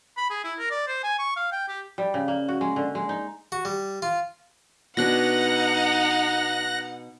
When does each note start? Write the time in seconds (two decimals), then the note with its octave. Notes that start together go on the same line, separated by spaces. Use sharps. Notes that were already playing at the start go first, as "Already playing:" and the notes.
0.17 B5
0.30 G#4
0.44 E4
0.59 A#4
0.70 D5
0.88 C5
1.03 G#5
1.19 C#6
1.36 F5
1.52 G5
1.68 G4
1.98 G3
2.14 C#3
2.28 A#3
2.48 F#4
2.61 G#3
2.76 D3
2.95 G#3
3.09 D#4
3.52 F#4
3.65 G3
4.02 F4
4.97 B2 D4 D#4 F#5 F#6 A#6